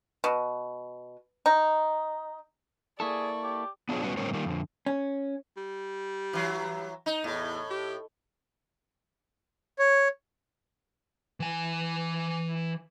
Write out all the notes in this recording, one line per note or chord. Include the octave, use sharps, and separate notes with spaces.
B2
D#4
A#3 E4 G#4 A4 D5 C#6
G4
B3 D4 F4 G#4 C#5
F#3 G3 B3 C#4 F#4 B4
A2 D3 G3 C4 A#4 C#5
D#3 G3 A#3
F2 D3
C#4
G3
E3 F#3
D#4
E2 A2
G4
C#5
E3 G#5